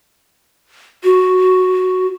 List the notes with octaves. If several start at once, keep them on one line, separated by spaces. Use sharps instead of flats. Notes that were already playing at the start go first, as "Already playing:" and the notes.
F#4